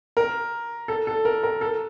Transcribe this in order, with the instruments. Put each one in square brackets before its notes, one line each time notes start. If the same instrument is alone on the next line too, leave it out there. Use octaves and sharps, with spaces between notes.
[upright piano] A#4
A4
A4
A#4
A#4
A4